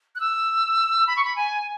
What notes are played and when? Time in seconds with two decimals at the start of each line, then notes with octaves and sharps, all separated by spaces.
0.15 F#6
0.20 E6
1.07 B5
1.17 C#6
1.24 B5
1.36 G#5